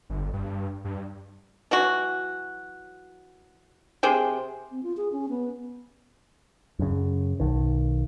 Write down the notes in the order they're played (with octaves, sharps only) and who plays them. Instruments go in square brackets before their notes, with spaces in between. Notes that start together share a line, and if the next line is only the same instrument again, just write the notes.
[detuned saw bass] G1
G2
G2
[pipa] E3 F#3 F#4
C3 G#4 C5 G5
[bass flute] C4
F4
G#4
C#4
B3
[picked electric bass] F#2 C#3
B1 D#3